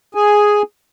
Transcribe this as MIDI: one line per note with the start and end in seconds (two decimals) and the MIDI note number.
0.15 0.62 68
0.15 0.62 80